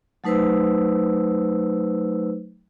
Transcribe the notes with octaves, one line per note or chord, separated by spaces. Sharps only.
F#3 A3 D#4 B4 C5 E6